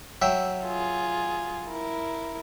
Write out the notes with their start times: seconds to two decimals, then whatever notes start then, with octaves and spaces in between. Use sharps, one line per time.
0.22 F#3 E5 G5
0.63 F4 G#4
1.67 E4 A#4